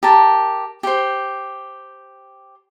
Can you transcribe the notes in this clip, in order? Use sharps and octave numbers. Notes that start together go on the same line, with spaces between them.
G4 A#4 A5
G4 C5